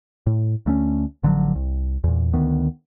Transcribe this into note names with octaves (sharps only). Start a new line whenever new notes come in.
A2
D2 A3 C4 C#4
A1 D3 F3 F#3
C2
E2 A#2
D2 D#3 B3